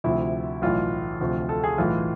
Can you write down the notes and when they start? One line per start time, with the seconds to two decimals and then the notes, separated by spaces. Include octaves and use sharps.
0.04 D2 C3 F3 E4
0.62 B1 A2 E3 F4
1.21 D2 C3 F3
1.49 A4
1.64 G#4
1.78 B1 A2 E3 F4